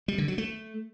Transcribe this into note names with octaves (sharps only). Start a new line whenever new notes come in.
G3
D3
F#3
A3